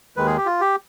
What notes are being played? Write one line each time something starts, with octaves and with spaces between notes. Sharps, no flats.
D#2 D#3 G#3 B4
G#4
G4
F4
G4